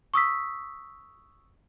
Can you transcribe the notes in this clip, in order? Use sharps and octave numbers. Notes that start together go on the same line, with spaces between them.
C#6 D#6 E6 B6